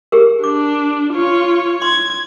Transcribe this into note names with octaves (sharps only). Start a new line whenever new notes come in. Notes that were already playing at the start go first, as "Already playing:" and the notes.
G4 G#4 A#4
D4 D6
F4 C#5
C6 G#6